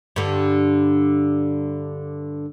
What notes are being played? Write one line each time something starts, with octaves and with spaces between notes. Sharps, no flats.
G2 D3